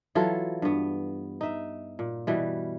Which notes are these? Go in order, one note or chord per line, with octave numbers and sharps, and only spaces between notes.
E3 F#3 F4 A4
G2 B3
D#4 E5
A#2
B2 E3 G3